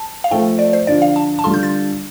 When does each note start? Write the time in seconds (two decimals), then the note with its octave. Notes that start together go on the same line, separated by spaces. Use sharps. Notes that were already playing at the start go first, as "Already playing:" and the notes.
Already playing: A5
0.24 F5
0.31 F3 A3 C4 F4 A4 G5
0.59 D5
0.73 C5
0.87 D3 F3 D4 F4 D5
1.02 F5
1.16 A5
1.39 A5
1.44 D3 G3 F4 A4 C6
1.54 G6
1.63 A6